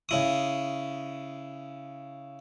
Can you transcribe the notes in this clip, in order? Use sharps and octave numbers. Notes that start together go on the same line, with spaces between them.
C#3 E4 D#6